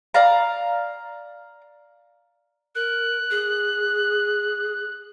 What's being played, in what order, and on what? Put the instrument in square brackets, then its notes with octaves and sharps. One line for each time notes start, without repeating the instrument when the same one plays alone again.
[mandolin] D5 F5 A#5
[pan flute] A#4 [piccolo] F#6
[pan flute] G#4